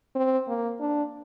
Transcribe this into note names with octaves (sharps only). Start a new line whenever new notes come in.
C4
A#3
D4